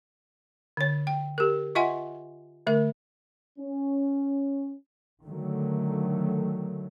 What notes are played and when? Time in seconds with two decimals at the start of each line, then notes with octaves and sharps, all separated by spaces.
0.77 D3 C#5
1.07 G5
1.38 G4 A#4
1.75 F4 D#5 E5 F#5 G#5 C6
2.67 D3 A3 A#4
3.59 C#4
5.25 D3 D#3 F#3 A3